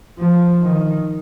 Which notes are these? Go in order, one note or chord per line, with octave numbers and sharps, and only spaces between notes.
F3
D#3